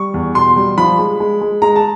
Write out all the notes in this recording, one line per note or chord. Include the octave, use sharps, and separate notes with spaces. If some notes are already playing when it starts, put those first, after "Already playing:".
Already playing: G3 C#6
E2
B2 C6
G3
F3 B5
G#3
G#3
G#3
G#3 A#5
A5